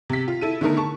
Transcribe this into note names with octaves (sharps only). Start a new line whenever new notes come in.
C3 B6
F4
E4 A4 D#7
D3 D#3 A3 B3 D#4 A#4
A5 C#6